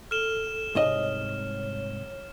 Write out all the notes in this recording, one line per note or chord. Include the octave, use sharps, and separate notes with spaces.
A4 F6 E7 G7
C2 G#2 C#5 D#5